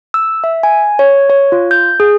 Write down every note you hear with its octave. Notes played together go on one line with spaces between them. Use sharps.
E6
E5
G#5
C#5
C#5
F4
G6
G#4